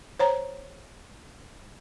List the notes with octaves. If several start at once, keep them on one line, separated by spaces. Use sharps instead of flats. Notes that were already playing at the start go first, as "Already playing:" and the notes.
C5 C#5 A#5